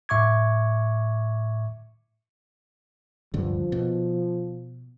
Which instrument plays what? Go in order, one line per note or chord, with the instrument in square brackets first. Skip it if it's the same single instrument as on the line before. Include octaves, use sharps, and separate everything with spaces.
[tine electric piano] A2 E5 C#6 D6 G#6
[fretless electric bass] D1 G2 D3 [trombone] F3
[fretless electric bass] B2